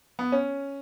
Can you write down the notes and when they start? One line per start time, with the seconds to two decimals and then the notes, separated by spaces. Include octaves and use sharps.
0.19 B3
0.32 C#4